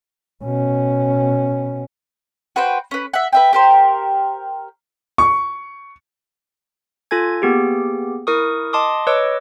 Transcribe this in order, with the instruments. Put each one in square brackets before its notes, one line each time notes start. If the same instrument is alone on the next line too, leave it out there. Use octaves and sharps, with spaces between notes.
[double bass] B2 C#4
[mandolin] F#4 B4 C5 G5
C#4 B4
E5 F#5
B4 E5 G5
G4 A#4 C5
[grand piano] C#6
[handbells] F4 A4 G#5 G#6
A#3 B3 G4 G#4
E4 A#4 C#6 D#6
D#5 A5 C6 D6 D#6
B4 C#5 D#5 D6 E6